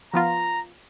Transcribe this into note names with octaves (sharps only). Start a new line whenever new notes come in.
F3 B3 F4 A#5